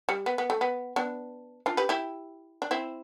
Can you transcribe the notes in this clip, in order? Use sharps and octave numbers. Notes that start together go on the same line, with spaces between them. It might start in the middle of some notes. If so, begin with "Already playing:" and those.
G3
B3
B3
A3
B3
B3 D4
D4 F4
G4 B4
E4 G4
D4
C4 E4